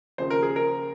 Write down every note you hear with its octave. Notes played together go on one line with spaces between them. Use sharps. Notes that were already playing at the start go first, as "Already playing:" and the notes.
D#2 C#3 F3 C5
A#4
G#4
A#4